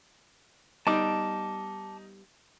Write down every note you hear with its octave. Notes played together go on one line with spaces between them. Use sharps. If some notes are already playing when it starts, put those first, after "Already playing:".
G3 B3 D#4 A5 D6